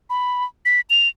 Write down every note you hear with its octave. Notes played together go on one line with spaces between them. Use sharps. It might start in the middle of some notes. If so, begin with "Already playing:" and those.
B5
B6
F7